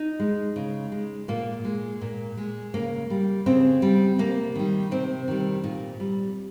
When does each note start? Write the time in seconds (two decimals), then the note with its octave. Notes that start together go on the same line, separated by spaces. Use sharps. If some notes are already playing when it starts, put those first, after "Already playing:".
Already playing: D#4
0.20 G#3
0.56 C#3
0.92 G#3
1.28 A#2 A#3
1.65 G#3
2.01 A#2
2.37 G#3
2.74 C#3 A#3
3.10 G3
3.46 C#3 C4
3.82 G3
4.19 C3 A#3
4.55 D#3 G3
4.91 C3 C4
5.28 D#3 G3
5.64 A#2
6.00 G3